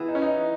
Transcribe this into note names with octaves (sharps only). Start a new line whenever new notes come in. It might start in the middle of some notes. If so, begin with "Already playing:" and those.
Already playing: E3 B3 E4 G#4
D#4
C#4
D#4